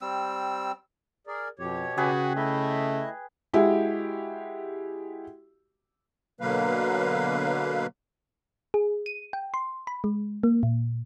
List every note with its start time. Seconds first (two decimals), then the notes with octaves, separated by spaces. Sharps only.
0.01 G3 C4 E6
1.27 G#4 A#4 D5
1.59 F2 B2 G4 C#5
1.97 C#3 F#4 G#4 B4 G5
2.37 A3 E4 D#5 E5
3.53 G#3 E4 F#4 G4
6.41 B2 D3 F#3 A#3 B4 F5
8.74 G#4
9.06 D#7
9.33 G5
9.54 C6
9.87 B5
10.04 G#3
10.43 A#3
10.63 A#2